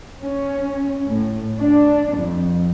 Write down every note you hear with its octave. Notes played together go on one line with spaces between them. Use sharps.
C#4
A2
D4
F2